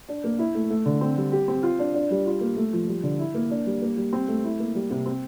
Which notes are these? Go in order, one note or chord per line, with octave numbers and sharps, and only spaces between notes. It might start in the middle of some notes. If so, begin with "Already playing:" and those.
D4
A#3
E4
A3
A3
D3
C4
G3
G4
C4
F4
D4
D4
G3
F4
A#3
A3
F3
G3
D3
E4
A#3
D4
G3
A#3
G3
C4
A3
E4
A#3
G3
C3
C4